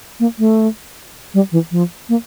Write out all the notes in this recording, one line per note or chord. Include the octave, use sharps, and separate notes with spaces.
A#3
A3
G3
E3
F3
A#3